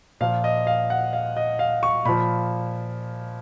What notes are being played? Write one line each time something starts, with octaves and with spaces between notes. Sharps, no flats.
A#2 F3 F5
D#5
F5
F#5
F5
D#5
F5
C#6
A#2 F3 B5